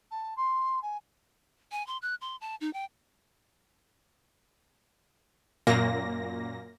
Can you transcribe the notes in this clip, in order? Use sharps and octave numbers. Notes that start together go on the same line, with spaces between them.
A5
C6
G#5
G#5
C6
F#6
C6
A5
D#4
G5
F#2 A#2 A#3 A#6